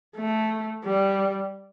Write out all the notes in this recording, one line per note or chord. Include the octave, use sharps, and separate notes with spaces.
A3
G3